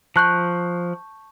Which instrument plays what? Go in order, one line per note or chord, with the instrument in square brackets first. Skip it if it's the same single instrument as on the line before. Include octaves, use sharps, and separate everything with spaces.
[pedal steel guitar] F3 F#6 [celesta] A5 C#6 G6